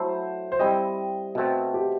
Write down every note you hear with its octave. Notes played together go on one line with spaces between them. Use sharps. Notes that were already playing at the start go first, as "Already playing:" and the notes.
Already playing: F#3 A3 E4 A4 C5
C5
G3 C4 E4 D#5
B2 A3 C4 B4
G4